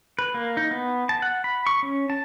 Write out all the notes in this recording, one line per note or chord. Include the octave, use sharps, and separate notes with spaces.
B4
A#3
D#4
B3
A5
F#5
B5
C#6
C#4
A5